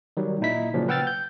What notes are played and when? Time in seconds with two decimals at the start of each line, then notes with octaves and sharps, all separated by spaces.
0.17 D#3 F#3 G3
0.41 A#2 D#4 E4 B6
0.73 A#2 C#3 F3 F#3
0.88 B4 F#5 G5 E6 F6 A6
1.07 G6